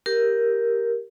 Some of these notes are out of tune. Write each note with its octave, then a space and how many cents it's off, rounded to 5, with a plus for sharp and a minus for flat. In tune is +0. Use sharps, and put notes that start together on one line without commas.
G4 +0 A#4 +0